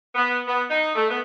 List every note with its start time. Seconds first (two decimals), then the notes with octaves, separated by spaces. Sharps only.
0.15 B3
0.47 B3
0.69 D#4
0.95 A3
1.10 B3